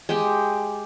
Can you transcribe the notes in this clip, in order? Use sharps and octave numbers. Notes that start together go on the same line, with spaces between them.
G#3 G4